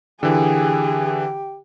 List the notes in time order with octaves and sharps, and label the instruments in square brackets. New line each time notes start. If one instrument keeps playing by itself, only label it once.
[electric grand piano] D3 E3 [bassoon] G4 [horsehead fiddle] G#4